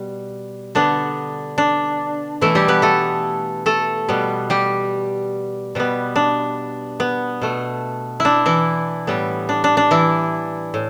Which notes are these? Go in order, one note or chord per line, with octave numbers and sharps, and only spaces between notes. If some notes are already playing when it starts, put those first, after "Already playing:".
Already playing: B2 G3
D3 B3 D4
D4
B2 E3 A3 E4
G3 G4
B3 B4
A3 A4
A3 A4
B2 G3 B3
G3 G4
B2 G3 B3
D4
B3
B2 A3
E4
D4
E3 E4
A2 G3 B3
D4
D4
D4
E3 E4
A2